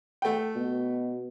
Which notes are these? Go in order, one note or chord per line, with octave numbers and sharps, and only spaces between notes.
A3 G5
B2